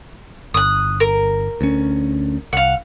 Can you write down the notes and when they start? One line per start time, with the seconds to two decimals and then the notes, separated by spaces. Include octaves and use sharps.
0.54 G1 D#6 F#6
1.00 A#4
1.61 D2 C#4
2.53 C2 F5 F#5